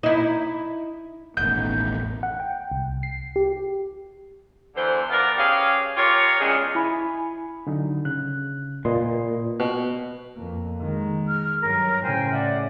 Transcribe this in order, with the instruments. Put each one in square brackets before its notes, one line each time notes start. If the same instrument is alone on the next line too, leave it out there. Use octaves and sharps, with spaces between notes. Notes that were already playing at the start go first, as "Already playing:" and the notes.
[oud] D#4 E4
[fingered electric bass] E1 A1 [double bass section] D#3 A3 B3 [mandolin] G6
[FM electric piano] F#5
G5
C2
C7
G4
[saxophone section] E2 D3 E3 C5
B3 F4 A#4 D5
C#4 G4 G#4 F5
F4 G4 A#4 C#5
E2 G2 G#3 C#4 G#4
[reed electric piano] E4 G#5 B5
D3 F#3 D#4
C#3 F#6
[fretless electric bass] A#2 [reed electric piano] B4 D#5 C6
[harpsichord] B2
[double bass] F2 A#3
D#3 G#3
[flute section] F6
[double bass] G2 F#3 [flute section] A#4
[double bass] A2 C#3 [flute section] C5 G5 G#5
[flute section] D5 E5 F#5